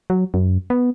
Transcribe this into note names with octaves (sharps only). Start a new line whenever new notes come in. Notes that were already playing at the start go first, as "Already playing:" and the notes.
F#3
F#2
B3